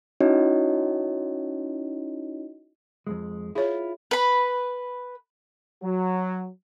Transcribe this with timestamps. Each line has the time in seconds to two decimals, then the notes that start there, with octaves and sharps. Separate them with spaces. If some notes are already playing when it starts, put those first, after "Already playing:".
0.20 C#4 D#4 E4 F#4 C#5 D#5
3.07 F2 G#2 G#3
3.55 E4 F4 G#4 C#5
4.11 B4 B5
5.82 F#3